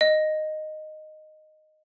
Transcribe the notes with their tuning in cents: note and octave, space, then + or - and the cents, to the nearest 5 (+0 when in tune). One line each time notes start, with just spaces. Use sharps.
D#5 -10